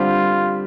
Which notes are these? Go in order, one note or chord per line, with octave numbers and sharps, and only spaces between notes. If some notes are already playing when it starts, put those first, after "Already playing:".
Already playing: D3 G3 C4 F4 G4